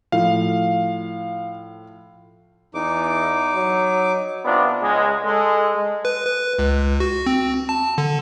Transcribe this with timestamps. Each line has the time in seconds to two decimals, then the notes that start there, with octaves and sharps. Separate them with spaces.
0.12 A2 F3 F5
2.74 E2 D#4 D6
3.54 F#3
4.45 C3 B3 D4 F4
4.82 C#2 G#3
5.25 G#3 A4
6.05 B4
6.26 B4
6.59 C#2
7.00 F#4
7.26 C4
7.69 A5
7.98 D3